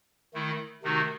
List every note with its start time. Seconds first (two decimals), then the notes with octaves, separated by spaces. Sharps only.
0.34 D#3 A3 E4
0.83 C3 D#3 A3 D#4 F#4